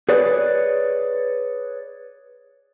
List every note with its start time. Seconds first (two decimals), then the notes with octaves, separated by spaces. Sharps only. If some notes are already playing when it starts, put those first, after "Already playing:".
0.09 G#4 B4 C#5 D5